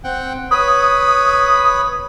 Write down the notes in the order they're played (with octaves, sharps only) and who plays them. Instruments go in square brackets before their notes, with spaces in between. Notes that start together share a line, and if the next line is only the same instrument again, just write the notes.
[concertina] C4 F#5 G5
[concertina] B4 C#5 B5 [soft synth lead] D#6